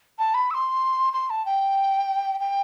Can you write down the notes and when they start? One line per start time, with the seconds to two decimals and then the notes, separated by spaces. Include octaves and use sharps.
0.19 A5
0.34 B5
0.51 E6
0.54 C6
1.13 C6
1.30 A5
1.46 G5
2.40 G5